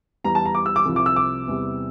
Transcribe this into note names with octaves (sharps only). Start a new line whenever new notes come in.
E2 E3 G3 A#5
A5
A#5
D6
E6
D6
C2 C3 F3
D6
E6
D6
E2 C3 G3